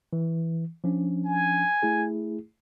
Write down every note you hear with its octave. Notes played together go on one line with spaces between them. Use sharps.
E3
F3 C#4 D4
G#5
A3 E4 G#4